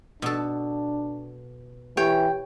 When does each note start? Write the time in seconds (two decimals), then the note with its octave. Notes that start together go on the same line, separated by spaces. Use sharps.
0.22 B2 D4 A4
1.97 E3 G4 C#5 G5